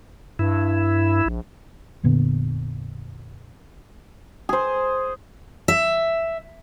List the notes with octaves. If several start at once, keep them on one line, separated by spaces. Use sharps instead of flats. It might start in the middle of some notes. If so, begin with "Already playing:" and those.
G2 E4
A#1
F1 A#2 D3 B3
G#4 C5
E5